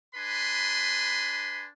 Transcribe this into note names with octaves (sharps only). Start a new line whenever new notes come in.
D4 B4 G#5 B5 C6